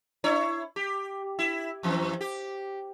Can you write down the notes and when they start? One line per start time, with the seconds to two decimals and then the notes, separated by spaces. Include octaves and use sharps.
0.24 D4 E4 C#5
0.76 G4
1.39 E4
1.83 F2 E3 C4
2.21 G4